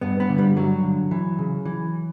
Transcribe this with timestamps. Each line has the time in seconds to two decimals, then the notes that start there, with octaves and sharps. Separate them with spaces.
0.01 G2 B3
0.20 B3
0.29 D3
0.38 G3
0.56 G2 F#3
0.83 D3
1.11 E3
1.39 C#3
1.65 E3